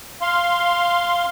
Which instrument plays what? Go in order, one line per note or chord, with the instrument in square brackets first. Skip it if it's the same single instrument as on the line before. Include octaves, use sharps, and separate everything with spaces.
[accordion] F5 C6